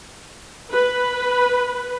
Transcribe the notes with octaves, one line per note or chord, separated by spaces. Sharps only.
B4